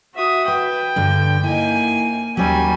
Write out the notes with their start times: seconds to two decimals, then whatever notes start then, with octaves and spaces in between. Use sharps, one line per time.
0.15 F#4 E5 D#6
0.48 B4 G5
0.96 G2 D3
1.44 A#3 D#4 E4 G#5
2.37 D#2 F#3 G3 C#4 F#5 G#5